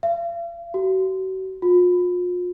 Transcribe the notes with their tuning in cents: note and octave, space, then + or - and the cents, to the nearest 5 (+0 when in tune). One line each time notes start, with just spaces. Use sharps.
F5 -45
F#4 +40
F4 +40